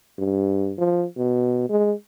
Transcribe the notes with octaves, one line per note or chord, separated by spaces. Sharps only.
G2
F3
B2
G#3